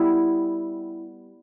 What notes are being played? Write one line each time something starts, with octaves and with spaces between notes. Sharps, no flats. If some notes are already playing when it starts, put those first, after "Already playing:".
Already playing: G3 B3 E4